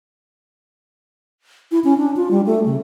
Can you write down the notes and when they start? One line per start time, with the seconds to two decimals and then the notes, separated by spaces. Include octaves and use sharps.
1.72 E4
1.84 C#4
1.98 D4
2.16 F4
2.31 G3
2.46 A3
2.66 C#3